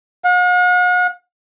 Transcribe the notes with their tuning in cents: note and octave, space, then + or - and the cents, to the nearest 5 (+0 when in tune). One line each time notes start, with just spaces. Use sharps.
F#5 -45